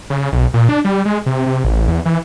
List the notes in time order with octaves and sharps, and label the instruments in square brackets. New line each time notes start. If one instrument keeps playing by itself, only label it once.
[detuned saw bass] C#3
B1
A#2
D4
G3
G#3
C3
C3
A1
E2
E3